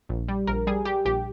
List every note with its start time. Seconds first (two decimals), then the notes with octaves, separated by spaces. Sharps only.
0.09 A#1
0.28 G3
0.47 A#1 A#4
0.67 G3 G#4
0.85 G3 G4
1.05 A#1 G4